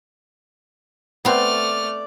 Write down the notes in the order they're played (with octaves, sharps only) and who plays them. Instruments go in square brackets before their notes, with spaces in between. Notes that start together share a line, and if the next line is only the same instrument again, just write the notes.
[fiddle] A3 F6 [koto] B3 C4 [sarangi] D5